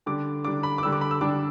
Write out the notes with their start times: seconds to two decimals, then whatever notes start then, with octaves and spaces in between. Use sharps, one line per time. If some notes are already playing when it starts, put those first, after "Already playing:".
0.06 D3 G3 D4 D6
0.45 D3 G3 D4 D6
0.63 B5
0.78 D6
0.82 D3 G3 D4 E6
0.92 D6
1.01 B5
1.11 E6
1.21 D3 G3 D4 D6